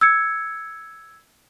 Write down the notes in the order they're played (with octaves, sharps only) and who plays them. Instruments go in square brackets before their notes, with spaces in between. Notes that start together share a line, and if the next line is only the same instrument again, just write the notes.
[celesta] E6 G#6 C#7